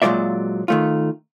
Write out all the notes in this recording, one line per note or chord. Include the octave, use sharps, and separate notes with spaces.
A#2 F#3 G#3 F4 D5 E5
D#3 A3 F4